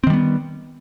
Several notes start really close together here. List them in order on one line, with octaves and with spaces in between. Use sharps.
C4 D#3 G3 B3